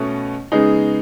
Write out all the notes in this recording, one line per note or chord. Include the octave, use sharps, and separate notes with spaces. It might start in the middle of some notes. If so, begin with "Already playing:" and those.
Already playing: B2 A3 C#4
C#3 G#3 B3 D#4 G#4